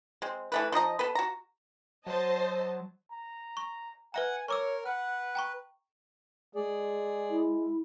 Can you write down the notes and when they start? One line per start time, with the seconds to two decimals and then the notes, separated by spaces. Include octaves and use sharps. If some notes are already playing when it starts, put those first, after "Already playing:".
0.22 G#3 C4
0.52 E3 A3 B4
0.72 F3 D#4 D#5 A#5
0.99 B3 A4 B4
1.15 F#4 A#5
2.06 F#3 C5 D#5 A5
3.11 A#5
3.57 C#6
4.14 B4 E5 F#5 G#5 A#5
4.48 A#4 C#5 C#6 D6 E6
4.86 B4 F#5 F6
5.35 G5 A#5 C#6
6.55 G#3 G#4 D5
7.30 E4